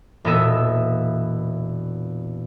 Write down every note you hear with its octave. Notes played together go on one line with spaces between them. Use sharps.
E1 A#2 B3 A4 D#5 E5